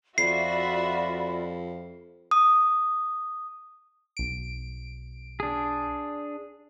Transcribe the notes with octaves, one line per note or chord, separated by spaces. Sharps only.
F2 F4 F#4 D5 E5 B5 C7
D#6
B1 D7
D4 G#4